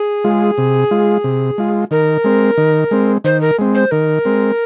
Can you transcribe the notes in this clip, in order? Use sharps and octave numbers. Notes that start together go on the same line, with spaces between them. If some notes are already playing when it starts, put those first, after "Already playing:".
Already playing: G#4
G#3 F4
C3
G#3 F4
C3
G#3 F4
D#3 A#4
G#3 C4
D#3
G#3 C4
D#3 C5
A#4
G#3 C4
C5
D#3 A#4
G#3 C4